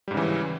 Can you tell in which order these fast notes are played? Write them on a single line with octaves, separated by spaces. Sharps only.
G3 G#2 C#3 E3